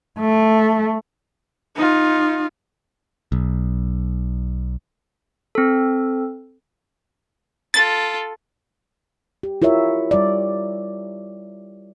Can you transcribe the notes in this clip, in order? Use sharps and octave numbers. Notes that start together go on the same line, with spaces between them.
A3
D#4 F4
B1
C4 A4
F4 A4 A6
G4
E4 F4 A#4 C#5 E5
G3 D5